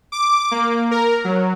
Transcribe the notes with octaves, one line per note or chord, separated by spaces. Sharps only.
D6
A#3
A#4
F#3